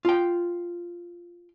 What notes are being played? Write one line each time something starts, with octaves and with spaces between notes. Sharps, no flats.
F4 G5